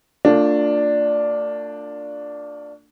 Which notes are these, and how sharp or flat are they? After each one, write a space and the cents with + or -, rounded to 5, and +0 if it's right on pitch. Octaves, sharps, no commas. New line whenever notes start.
A3 +45 D4 +0 F4 +15